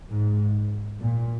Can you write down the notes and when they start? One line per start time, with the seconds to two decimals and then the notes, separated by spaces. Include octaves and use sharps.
0.11 G#2
0.99 A#2